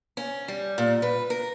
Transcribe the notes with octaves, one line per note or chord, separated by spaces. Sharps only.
C#4
G3
A#2
B4
A#4